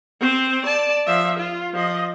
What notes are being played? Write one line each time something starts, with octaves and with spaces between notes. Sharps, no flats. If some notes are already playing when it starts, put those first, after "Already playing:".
C4 C5
D5 A5
F3 E5
F4
F3 D#5